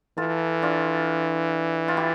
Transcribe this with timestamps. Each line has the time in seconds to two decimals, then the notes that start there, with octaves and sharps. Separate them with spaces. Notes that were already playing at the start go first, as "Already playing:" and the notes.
0.17 E3 F4 A4
0.62 D4 F4
1.88 F4
1.97 E4 G4